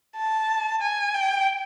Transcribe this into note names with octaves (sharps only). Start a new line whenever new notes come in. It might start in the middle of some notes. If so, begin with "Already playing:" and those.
A5
G#5
G5